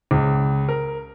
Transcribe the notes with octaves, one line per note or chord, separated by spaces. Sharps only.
C#2
A#4